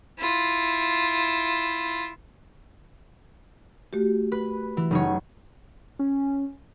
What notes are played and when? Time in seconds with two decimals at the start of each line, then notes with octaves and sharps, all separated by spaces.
0.19 E4 F4
3.93 A3 F#4 G4
4.32 B4
4.77 E3
4.91 F#1 D#4 C#5
5.99 C#4